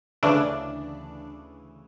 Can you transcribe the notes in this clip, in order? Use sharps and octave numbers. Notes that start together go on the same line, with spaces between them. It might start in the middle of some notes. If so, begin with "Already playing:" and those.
D2 C#3 E3 D4